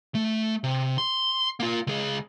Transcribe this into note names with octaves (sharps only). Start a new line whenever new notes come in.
A3
C3
C6
A#3 F4
C#2 G#4